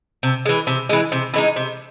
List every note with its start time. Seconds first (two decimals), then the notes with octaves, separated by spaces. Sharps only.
0.23 C3
0.45 E3 G#3
0.67 C3
0.89 E3 G#3
1.12 C3
1.34 E3 G#3 D#4
1.56 C3